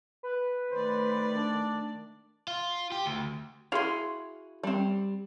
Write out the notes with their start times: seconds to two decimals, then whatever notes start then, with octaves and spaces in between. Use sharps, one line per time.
0.23 B4
0.72 D#3 A3 C5 D5
1.35 D4
2.48 F4
2.92 G4
3.06 D2
3.72 E4 F#4 G#4 F5 C6
4.63 G3 C4